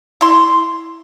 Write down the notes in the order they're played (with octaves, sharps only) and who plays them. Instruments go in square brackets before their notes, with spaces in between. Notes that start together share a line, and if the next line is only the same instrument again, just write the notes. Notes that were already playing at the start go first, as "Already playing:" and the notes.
[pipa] E4 C6